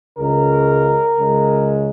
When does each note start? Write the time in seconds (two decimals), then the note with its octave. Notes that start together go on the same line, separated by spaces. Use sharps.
0.17 C#2 C#3 G#3 A#4
1.17 C#2 C#3 G#3